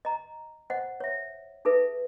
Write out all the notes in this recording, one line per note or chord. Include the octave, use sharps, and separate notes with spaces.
D#5 A#5
C5 D#5 F#5
C#5 E5
D#4 G#4 A4 B4 E5